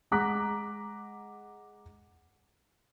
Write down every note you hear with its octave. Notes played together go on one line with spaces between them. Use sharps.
G#3 F#5 A#5 D6 F#6 B6